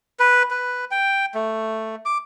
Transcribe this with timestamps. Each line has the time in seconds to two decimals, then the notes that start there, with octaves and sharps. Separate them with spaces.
0.19 B4
0.51 B4
0.91 G5
1.34 A3
2.05 D6